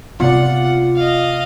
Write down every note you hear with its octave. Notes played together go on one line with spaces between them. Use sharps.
C3 B3 F4 D5 F#5
D#5 F5